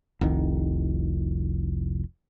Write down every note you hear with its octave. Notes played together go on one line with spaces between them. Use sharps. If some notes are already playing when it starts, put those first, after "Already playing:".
F1 C2 D#3